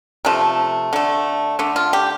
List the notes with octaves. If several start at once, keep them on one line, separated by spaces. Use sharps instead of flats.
C3 F3 A3
D3 A3
D3 A3
F4
G4